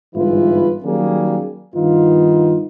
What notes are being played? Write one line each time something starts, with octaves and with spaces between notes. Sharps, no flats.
G1 G#2 E3 E4 F4 B4
D#3 F#3 G3 A#3 C#4 G#4
G2 D#3 B3 D#4 F4